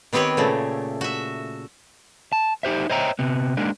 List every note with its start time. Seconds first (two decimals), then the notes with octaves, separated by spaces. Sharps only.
0.13 D#3 B3 C4 G4 B4 C#5
0.37 A#2 C#3 A3
1.01 F#4 E5
2.33 A5
2.63 D#4 G4 C5 E5
2.90 C5 C#5 D#5 E5 G5 A#5
3.19 C3 B3
3.57 G#3 A#3 D4 D#4